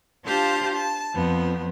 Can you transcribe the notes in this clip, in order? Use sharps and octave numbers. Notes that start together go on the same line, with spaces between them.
D4 F4 G4 C5 F5 A5
A5
F2 F3 B3